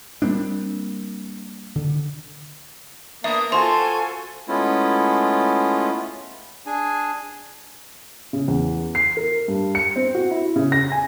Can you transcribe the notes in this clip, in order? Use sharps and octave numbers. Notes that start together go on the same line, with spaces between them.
G3 A#3 C4 D4
D3
A#3 B3 D4 E5 D#6
F4 F#4 A4 C5 G#5 A5 C6 C#6
G#3 A3 B3 C#4 E4 F4
D4 G#4 G#5
C#3
E2
C7
A#4
G2
C#7
C4
F#4
E4
C#3
A#6
G#5